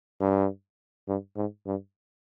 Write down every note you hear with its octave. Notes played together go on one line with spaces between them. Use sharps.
G2
G2
G#2
G2